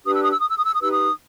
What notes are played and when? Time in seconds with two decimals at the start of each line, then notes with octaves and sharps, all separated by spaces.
0.05 D4 G4 B4 D#6
0.13 E6
0.22 D#6
0.30 E6
0.39 D#6
0.48 E6
0.57 D#6
0.65 E6
0.74 D#6
0.81 D#4 G4 B4 E6
0.92 D#6